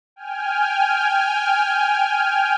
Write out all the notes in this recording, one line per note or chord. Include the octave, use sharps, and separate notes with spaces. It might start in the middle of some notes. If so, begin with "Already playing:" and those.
G5 G#5 F6